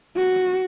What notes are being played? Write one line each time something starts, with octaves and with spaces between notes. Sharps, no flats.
F#4